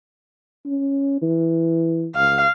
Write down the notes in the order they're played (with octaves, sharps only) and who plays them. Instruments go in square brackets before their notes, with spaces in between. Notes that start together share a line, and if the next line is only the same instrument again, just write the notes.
[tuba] C#4
E3
[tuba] C#2 [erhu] F5